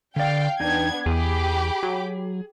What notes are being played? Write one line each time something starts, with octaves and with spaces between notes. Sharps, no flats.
D3 D5 F5 G5
E2 B3 D4 D#4 G5 G#6
E2 G4 G#4 B5 D6
F#3